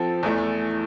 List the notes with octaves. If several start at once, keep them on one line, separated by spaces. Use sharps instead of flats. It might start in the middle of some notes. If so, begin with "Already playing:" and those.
Already playing: F3 C4 A4
E2 E3 A3